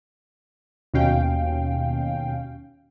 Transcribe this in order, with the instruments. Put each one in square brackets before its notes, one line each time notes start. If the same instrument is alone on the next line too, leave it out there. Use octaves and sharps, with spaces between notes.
[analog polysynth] D#2 B2 C#4 F5 G5